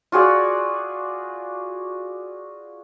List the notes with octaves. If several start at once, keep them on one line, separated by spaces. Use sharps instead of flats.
F4 F#4 G#4 D5